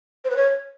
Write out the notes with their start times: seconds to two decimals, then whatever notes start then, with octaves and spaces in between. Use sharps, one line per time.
0.25 C5
0.30 B4
0.36 C#5